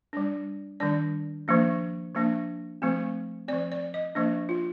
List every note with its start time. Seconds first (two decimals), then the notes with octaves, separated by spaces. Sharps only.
0.13 G3 D4
0.80 D#3 G3 D4 D5
1.48 F3 A#3 D4
2.15 F3 A#3 D4
2.82 F3 A3 C4
3.48 F3 C4 D5
3.72 D5
3.94 D#5
4.15 F3 A#3 D4 D#5
4.49 F4